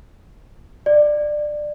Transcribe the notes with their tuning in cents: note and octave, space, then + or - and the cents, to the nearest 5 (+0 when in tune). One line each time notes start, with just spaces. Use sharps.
D5 +20